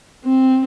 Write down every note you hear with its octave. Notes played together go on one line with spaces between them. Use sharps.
C4